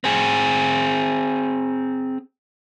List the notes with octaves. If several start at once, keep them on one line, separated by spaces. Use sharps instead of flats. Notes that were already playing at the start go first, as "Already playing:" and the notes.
C4 G#4